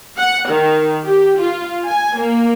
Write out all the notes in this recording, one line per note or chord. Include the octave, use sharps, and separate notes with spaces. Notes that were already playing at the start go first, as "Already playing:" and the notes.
F#5
D#3
G4
F4
G#5
A#3